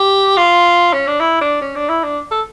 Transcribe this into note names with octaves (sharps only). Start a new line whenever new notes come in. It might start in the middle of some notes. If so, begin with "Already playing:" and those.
Already playing: G4
F4
C#4
D4
E4
D4
C#4
D4
E4
D4
A4